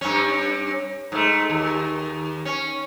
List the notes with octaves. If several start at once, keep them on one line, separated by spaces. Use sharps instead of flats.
G2 C#4
G#2 A3
D#2
C#4